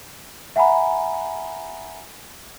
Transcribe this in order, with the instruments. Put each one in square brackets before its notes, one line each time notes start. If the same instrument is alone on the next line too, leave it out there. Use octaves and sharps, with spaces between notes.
[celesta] E5 F#5 G#5 A#5 B5